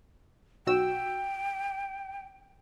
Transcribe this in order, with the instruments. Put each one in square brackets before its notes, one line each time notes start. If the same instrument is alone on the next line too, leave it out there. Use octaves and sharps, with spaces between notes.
[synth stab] B1 F#4 E6 [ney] G5